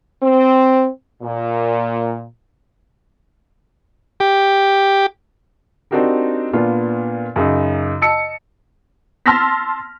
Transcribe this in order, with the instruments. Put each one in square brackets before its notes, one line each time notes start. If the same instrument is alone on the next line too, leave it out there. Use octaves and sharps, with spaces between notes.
[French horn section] C4
A#2
[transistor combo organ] G4
[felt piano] C4 D4 D#4 F#4 G4 A#4
A#2 B3 D4 F4
F#2 C#3 F#3 D#4
D#5 A5 E6 C#7
[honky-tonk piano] A5 C6 E6 F6 A#6 B6